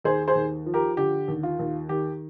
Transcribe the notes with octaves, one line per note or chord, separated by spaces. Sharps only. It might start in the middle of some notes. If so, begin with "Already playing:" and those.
D#2 G#4 C5
G#4 C5
D#2
F3
G4 A#4
D3 G4
D#2
F4
D#2
D#3 G4